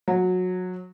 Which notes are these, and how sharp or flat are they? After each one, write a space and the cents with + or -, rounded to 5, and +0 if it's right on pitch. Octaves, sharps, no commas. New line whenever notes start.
F#3 -20